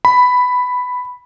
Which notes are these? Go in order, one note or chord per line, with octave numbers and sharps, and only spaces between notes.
B5